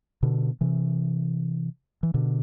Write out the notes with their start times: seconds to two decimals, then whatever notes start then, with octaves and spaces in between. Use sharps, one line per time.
0.23 B2 D3
0.61 C3 E3
2.03 E3
2.14 B2 D3